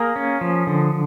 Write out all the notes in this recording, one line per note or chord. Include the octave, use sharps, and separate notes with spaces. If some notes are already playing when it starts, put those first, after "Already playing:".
Already playing: A#3 G#4 A#4
C#4
F3
D3